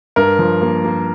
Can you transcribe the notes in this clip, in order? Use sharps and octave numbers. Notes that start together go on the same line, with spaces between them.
G2 A#4
F3
A#3
A#3